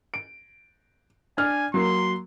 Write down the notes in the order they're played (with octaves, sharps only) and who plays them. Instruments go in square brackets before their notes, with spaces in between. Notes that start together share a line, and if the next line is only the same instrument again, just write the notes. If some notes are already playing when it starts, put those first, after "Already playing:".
[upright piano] D7
[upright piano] D4 F6 [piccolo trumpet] G#5
[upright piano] F#3 A#3 [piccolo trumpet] C6